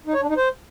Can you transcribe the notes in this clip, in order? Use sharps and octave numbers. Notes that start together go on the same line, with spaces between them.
D#4
C#5
D4
D#4
C5